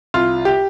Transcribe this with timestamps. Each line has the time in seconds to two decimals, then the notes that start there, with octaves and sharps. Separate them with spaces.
0.14 C2 F4
0.45 G4